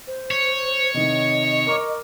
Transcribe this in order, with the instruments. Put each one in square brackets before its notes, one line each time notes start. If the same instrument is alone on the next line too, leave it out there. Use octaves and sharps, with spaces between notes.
[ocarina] C5
[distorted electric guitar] C#5
[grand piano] C3 D#3 [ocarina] D#5
[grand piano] A#4 C#6 D6